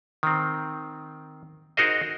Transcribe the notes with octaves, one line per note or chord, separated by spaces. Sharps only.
D#3 C4
D#4 F#4 G#4 A#4 C5 D#5